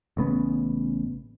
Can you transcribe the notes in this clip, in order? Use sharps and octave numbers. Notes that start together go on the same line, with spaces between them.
A1 C#3 B3